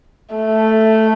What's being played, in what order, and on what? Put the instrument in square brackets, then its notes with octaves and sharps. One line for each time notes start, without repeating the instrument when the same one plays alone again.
[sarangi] A3